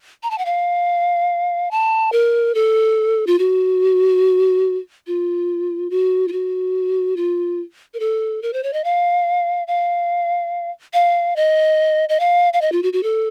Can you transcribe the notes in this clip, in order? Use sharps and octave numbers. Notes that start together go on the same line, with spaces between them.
A#5
A5
F#5
F5
A5
A#4
A4
F4
F#4
F4
F#4
F4
F#4
F4
A#4
A4
A#4
C5
C#5
D#5
F5
F5
F5
D#5
D#5
F5
F5
D#5
F4
F#4
F#4
A4